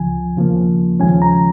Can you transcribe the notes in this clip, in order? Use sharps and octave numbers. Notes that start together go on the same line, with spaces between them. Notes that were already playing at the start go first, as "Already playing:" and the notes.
Already playing: C#2 C#3 F3 G#5
D#2 C#3 F3 A#3
D#2 C#3 F3 G#3 C#4 G#5
A#5